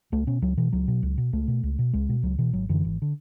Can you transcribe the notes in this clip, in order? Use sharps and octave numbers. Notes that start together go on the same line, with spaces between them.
C#2 A3
B2 C#4
C#2 F#3
B2 E3
C#2 F#3
B2
C#2
B2
C#2 A3
B2
C#2
B2
C#2 G#3
B2
C#2 F#3
B2 E3
G#1 F#3
F#2 D3 E3
G#1
D3